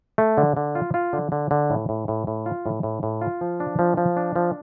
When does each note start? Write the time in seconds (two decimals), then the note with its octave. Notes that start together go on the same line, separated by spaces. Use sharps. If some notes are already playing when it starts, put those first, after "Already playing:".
0.18 A3
0.38 D3
0.57 D3
0.75 F4
0.94 F4
1.13 D3
1.32 D3
1.51 D3
1.70 A2
1.89 A2
2.08 A2
2.27 A2
2.46 F4
2.66 A2
2.83 A2
3.03 A2
3.21 F4
3.41 F3
3.60 D4
3.79 F3
3.97 F3
4.17 D4
4.36 F3